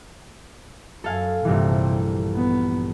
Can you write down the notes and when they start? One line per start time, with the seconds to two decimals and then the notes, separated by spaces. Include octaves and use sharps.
1.04 F#2 A4 F5 G#5
1.45 A#1 G2 C3 D#3 E3
2.35 B3